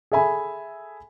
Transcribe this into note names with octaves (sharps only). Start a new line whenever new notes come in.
G#4 A4 E5 G#5 B5